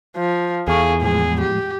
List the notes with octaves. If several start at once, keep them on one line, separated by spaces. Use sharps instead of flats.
F3
E2 G#4 A4 F5 C#6
A2 F3 G#3 G#4
G4